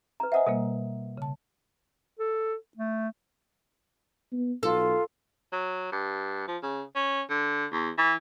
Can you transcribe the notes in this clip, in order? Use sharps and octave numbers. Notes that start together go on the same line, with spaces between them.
B4 A#5
C5 D#5 E5 F#5 G#5 D#6
B2 G3 A#3 A#4
C#3 A5
A4
A3
B3
B1 F4 A4
F#3
G2
F3
C#3
C#4
D3
E2
E3